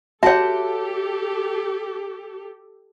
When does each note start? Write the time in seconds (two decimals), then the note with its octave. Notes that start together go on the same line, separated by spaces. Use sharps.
0.23 F#4 G4 A4 C#5 E5 F#5 A5